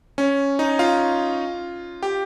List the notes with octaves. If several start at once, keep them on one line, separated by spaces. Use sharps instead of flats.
C#4
D#4
F4
G4